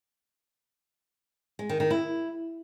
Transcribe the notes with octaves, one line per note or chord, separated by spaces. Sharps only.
G#3
D#3
D#3
E4